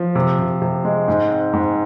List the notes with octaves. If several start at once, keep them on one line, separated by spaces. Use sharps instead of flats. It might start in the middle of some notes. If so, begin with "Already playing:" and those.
Already playing: F3
C3
C3
C3
G#3
G#2
C4
G#2